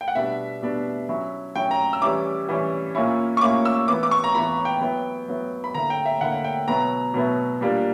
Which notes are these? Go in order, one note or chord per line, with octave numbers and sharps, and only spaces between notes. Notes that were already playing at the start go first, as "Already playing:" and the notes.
G5
F#5
B2 G3 B3 D4 E5
B2 G3 B3 D4
F#3 C#4 E4
F#3 C#4 E4 G5
A#5
E6
E3 G3 C#4 E4 D6
E3 G3 C#4 E4
A#2 A#3 C#4 E4
C#6
A#2 A#3 C#4 E4 D6
E6
E3 B3 E4 D6
D6
C#6
A#5
E3 B3 E4 B5
G5
F#3 B3 E4
F#3 B3 E4
B5
D3 A#3 E4 A#5
G5
E5
D3 A#3 E4 F#5
G5
B2 F#3 B3 E4 A#5
B2 F#3 B3 E4
A#2 G3 A#3 D4